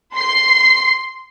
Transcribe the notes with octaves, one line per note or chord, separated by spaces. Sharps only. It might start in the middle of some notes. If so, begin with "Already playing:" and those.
C6 C7